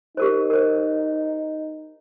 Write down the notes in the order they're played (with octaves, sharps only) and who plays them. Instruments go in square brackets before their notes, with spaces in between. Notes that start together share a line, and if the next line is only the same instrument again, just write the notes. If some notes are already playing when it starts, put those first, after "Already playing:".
[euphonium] D#4 [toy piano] G4 A#4 C5
[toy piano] A#4 C5